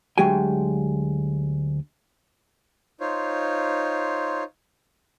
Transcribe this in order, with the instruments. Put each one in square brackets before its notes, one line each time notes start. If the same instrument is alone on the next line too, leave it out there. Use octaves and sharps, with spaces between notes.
[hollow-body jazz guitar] D2 F#3 G#3 G4 G5 G#5
[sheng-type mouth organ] D#4 F4 C5 C#5